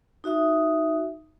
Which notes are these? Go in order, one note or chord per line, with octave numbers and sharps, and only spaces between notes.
D#4 F#4 E5 D#6